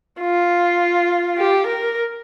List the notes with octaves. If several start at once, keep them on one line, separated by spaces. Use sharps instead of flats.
F4
G4
A#4